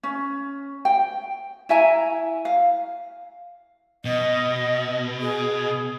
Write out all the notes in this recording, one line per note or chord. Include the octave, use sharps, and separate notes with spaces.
C#4
G5
E4 E5 G#5 A#5
F5
B2 D#5
G#4